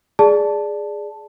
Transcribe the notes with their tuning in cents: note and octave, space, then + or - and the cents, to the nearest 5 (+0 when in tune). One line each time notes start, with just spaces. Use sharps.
G#4 +0 D5 +0 A5 +0